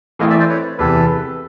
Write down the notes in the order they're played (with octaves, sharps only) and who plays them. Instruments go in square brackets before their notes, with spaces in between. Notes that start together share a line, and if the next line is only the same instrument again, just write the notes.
[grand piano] E3 A3 C4 E4 [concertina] D#5 F5
[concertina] D5 E5
C5 D5
B4 C#5
[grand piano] E2 C3 E3 [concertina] A4 B4